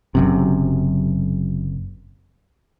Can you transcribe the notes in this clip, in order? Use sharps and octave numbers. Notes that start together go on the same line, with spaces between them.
F#1 F#2 C3